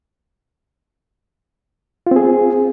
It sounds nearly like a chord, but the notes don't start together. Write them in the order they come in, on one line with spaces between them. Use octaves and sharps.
F4 C4 G#4